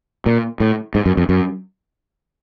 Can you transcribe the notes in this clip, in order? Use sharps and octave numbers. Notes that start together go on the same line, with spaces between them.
A#2
A2
G#2
F#2
F2
F#2